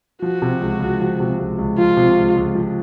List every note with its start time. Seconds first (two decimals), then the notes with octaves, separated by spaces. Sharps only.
0.22 F3 F#4
0.42 C3
0.61 C#2
0.80 C#2
1.00 F3
1.20 C3
1.39 C#2
1.58 C#2
1.78 F3 F4
1.97 C3
2.17 C#2
2.36 C#2
2.55 F3